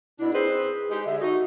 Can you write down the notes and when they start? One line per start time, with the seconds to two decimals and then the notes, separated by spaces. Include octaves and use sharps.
0.19 B2 D4 E4
0.33 C4 G#4 B4 C5
0.91 G#3 D#4 G4
1.06 D3 G#3 E5
1.21 D#4 F#4